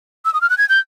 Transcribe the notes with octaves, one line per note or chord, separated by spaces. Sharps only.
E6
D#6
F6
F#6
G#6
G6